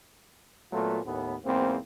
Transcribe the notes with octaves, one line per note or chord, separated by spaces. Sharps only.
A#2 F#3 A3 B3 F4 A4
D#2 A2 B3
E2 G#2 A#3 C4